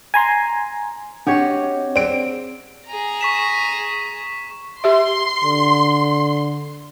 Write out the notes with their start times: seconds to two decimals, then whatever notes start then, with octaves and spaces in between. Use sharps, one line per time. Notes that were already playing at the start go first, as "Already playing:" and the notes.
0.14 G#5 A#5 C6
1.27 C4 D4 F#4 G4 C#5 D#5
1.96 C4 G#4 D5 D7
2.86 G#4 A#5
3.21 C#6 B6 E7
4.84 G4 E5 C6
5.44 D3